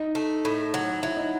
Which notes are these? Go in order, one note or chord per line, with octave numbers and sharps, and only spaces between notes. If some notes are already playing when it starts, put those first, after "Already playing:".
Already playing: D#4
A3
A2
F#3
F#3 E4
D#4